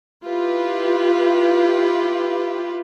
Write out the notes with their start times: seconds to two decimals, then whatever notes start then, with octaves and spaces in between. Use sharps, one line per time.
0.24 E4 F4 G4 B4